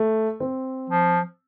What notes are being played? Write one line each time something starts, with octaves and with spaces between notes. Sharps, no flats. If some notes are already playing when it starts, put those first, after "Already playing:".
Already playing: A3
C4
F3